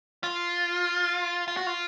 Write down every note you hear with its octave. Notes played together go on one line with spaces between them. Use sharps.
F4
F4
F#4
F4